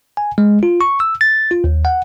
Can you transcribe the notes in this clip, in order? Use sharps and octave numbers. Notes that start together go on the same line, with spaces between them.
G#5
G#3
F4
C#6
E6
A6
F4
D#2
F#5